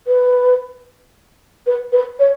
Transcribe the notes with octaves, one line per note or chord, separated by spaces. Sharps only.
B4
B4
B4
C#5